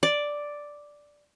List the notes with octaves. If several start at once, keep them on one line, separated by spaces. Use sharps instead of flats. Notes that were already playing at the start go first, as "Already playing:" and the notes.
D5